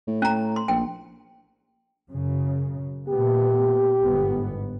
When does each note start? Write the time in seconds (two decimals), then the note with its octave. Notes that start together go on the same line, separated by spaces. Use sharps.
0.07 A2
0.22 C#4 A#5
0.56 C6
0.68 A#1 G5
2.12 F#2 C#3
3.09 A#2 A3 B3 G4
4.05 G1 G#2 B3